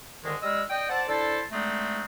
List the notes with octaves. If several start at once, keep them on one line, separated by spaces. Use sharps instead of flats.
D2 D3 D#3 G#3
G3 G#3 D#5 E6 F6
D5 D#5 G5
C5 D5 F#5 A5
D4 E4 A4 C5 A5
D3 G#3 A3 C4 D#4